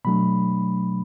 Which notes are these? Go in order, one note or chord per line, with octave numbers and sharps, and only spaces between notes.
B2 F#3 A3 D4 B5